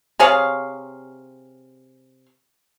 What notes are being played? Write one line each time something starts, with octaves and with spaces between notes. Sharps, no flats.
C3 G#4 C#5 F5